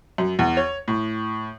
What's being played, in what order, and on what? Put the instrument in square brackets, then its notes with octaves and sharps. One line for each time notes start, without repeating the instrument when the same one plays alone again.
[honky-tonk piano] F#2
E2
C#5
A2